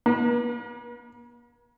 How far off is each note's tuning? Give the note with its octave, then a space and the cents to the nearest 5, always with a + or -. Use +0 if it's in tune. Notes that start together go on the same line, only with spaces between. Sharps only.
A#3 +45 B4 -35